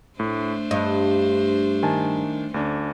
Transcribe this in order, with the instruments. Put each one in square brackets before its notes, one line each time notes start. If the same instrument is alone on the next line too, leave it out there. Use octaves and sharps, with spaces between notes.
[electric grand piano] A2 [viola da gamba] A3 D4 C5
[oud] G2 [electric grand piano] D#5
[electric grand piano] D#3 G#5 A5
[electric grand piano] D2 D4 [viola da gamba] C#4